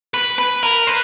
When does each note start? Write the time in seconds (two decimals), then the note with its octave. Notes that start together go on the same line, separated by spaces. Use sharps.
0.14 B4
0.38 B4
0.63 A#4
0.87 B4